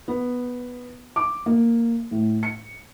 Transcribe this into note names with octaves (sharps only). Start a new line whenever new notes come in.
B3
D6
A#3
A2
C#7